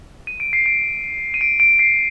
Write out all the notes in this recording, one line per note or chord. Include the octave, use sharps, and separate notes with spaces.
D#7
D7
C7
D7
D#7
D7
D7
C7